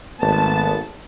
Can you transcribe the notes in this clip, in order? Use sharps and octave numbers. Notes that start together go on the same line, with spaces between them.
G#1 A3 B3 A5